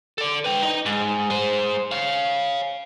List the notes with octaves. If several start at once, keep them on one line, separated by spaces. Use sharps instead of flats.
A4 D5
B4 G5
D#4 D#5
G#2
G#3 C5
C#5 F5